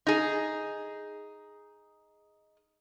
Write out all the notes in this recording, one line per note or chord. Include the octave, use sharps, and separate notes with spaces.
D#4 G#4